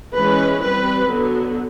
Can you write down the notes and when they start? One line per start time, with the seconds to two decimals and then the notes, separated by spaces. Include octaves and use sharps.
0.13 E3 G#3 C#4 B4
0.60 G3 C4 B4
1.07 D3 F#3 B3